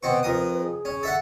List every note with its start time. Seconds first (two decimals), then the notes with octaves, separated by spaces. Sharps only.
0.03 B2 C4 B4 C#6
0.23 F2 A#4 D#6
0.62 G#4
0.85 C#4
1.03 A4 E5 F#5